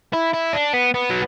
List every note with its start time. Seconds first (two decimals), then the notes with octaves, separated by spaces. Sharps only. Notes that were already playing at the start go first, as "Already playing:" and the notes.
0.13 E4
0.34 E4
0.53 D4
0.74 B3
0.94 B3
1.10 F#3